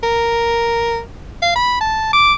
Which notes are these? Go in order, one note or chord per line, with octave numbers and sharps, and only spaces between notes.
A#4
F5
B5
A5
D6